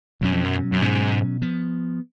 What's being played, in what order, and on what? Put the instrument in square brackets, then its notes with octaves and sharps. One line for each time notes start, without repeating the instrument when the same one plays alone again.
[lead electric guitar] F#2 [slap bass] B2 F#3 C#4
[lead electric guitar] F2
F#2
F#2
[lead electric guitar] G#2 [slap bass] B2 F#3 C#4
[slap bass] F3 B3